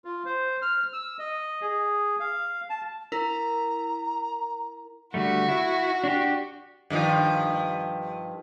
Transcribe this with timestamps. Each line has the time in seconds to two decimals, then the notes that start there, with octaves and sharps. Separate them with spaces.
0.05 F4
0.25 C5
0.62 F6
0.93 E6
1.19 D#5
1.61 G#4
2.20 F5
2.70 A5
3.12 E4 A#4 A#5
5.14 D3 G3 A3 F#4
5.49 E4
6.04 D4 G4
6.90 G2 D#3 F3